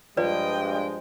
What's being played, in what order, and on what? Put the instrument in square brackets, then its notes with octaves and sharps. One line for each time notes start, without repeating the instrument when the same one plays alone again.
[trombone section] G2 G#3 [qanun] F3 [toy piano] B4 D5 [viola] D#5 G5